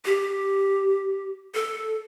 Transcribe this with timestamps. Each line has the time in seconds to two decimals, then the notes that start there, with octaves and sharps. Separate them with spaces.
0.05 G4
1.54 A4